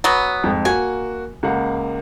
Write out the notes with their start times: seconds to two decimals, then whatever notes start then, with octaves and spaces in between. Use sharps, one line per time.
0.04 F#3 B3
0.44 F2 G#2
0.65 A#3 F#4 G#5
1.43 C#2 A#3 F#5